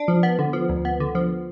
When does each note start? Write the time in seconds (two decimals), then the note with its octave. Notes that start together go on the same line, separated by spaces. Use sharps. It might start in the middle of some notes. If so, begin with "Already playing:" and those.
Already playing: D4
0.08 F3
0.23 B3
0.39 D3
0.53 F3
0.69 D2
0.85 B3
1.00 D3
1.15 F3